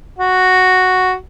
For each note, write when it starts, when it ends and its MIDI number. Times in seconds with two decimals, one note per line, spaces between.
0.18 1.15 66